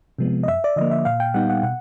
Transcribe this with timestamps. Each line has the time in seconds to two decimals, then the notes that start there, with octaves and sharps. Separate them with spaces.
0.18 C3 F3 G#3 B3
0.43 D#5
0.47 F#2 E5
0.64 D5
0.76 D3 F3 A#3 D#5
0.91 E5
1.05 A#2 F5
1.20 G5
1.34 G3 B3 D#4 F#5
1.50 F#5
1.63 B2 F#5